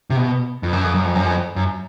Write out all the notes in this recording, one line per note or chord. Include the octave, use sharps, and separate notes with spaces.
C3
B2
F2
F#2
F2
F#2
F2
F#2
F2
F#2